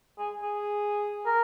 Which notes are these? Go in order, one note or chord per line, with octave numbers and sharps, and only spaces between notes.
G#4
G#4
A#4